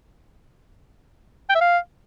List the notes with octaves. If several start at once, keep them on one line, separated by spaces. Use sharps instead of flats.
G5
E5
F5